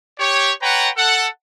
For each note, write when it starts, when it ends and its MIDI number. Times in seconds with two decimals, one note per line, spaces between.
0.19 0.52 67
0.19 0.52 73
0.62 0.89 71
0.62 0.89 73
0.62 0.89 78
0.62 0.89 79
0.62 0.89 82
0.97 1.26 69
0.97 1.26 78